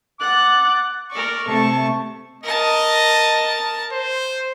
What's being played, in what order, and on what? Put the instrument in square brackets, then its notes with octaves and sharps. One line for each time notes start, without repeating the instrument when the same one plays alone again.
[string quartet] F#5 F#6 A6 [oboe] D6
[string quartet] A#4 D5 C#6
C3 A3 A4 A5 C#6
[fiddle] A#4 A5 [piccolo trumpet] D#5
[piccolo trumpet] C5